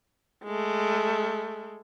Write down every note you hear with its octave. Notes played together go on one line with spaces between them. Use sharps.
G#3 A3